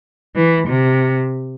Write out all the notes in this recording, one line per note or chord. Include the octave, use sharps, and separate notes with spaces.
E3
C3